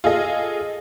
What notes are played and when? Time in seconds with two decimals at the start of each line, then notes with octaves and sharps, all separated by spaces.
0.04 F4 G#4 A4 D#5